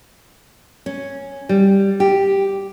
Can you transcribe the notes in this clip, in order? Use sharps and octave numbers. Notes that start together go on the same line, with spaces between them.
C#4
G3
G4